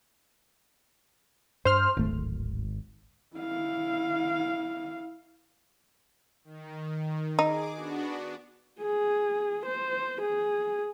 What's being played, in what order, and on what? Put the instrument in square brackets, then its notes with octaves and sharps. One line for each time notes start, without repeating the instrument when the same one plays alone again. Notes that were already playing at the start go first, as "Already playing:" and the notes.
[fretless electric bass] G2 [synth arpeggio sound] C5 F6
[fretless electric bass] D1 A3 [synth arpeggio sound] G#1
[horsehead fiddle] E4 F5
[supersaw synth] D#3
[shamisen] D#4 [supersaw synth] G#4 D6
[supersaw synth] B3 D4 F#4
[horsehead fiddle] G#4
C5
G#4